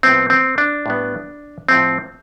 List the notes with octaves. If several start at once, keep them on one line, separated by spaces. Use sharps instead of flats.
A2 F3 B3 C4
C4
D4
A2 G3 B3
A2 F3 C4